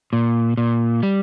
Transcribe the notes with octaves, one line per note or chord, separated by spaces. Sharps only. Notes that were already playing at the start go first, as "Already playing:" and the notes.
A#2
A#2
G3